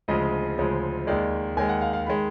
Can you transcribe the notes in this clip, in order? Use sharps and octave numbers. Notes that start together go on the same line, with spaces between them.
D2 C#3 F3 G#3 D#5
D2 C#3 F3 G#3
D#2 D#3 G#3 D5
D#2 D#3 G#3 G#5
F#5
F5
F5
D#3 G#3 B5